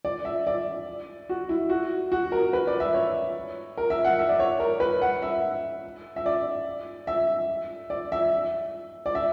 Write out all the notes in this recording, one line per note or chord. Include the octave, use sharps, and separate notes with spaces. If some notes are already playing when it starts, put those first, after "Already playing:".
D5
E5
D5
F#4
E4
F#4
F#4
A#4
B4
D5
E5
C#5
A#4
E5
F#5
E5
D5
C#5
A#4
B4
F#5
E5
E5
D5
E5
D5
E5
D5
E5